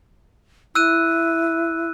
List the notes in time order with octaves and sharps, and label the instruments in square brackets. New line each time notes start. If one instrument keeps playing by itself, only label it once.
[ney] E4 [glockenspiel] E6 F#6 D#7